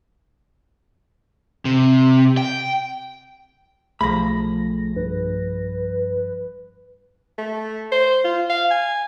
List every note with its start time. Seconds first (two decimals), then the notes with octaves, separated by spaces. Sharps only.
1.65 C3
2.37 G5
4.01 B1 F3 A3 G#4 B5 A#6
4.96 G2 B4
7.38 A3
7.92 C5
8.24 F4
8.49 F5
8.71 G#5